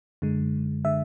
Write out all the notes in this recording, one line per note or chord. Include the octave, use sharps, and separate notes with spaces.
F#2 D3 G#3
D3 G#3 E5